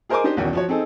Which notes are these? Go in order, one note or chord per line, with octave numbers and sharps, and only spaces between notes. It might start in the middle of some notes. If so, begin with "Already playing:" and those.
G#4 A#4 C5 D#5 G#5 D6
D4 D#4 G4 C5 D#5
B1 E2 D#3 C#4 F#4
F3 F#4 C#5
C4 D#4 G#4 A4